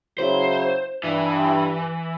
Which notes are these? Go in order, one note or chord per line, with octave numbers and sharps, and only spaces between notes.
C#3 F#3 E4 C5
G2 E3